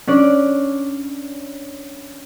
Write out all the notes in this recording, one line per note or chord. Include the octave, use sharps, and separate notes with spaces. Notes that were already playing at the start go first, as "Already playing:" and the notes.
C#4 D4 D5